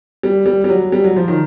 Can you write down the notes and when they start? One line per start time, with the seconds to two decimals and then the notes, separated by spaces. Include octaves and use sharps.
0.23 G3
0.46 G3
0.64 G3
0.69 F#3
0.92 G3
1.04 F#3
1.16 F3
1.28 D#3